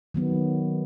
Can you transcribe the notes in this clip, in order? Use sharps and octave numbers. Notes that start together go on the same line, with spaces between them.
D#3 F#3 B3